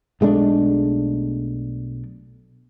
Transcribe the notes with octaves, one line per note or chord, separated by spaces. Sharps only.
B1 G#3 A3 D4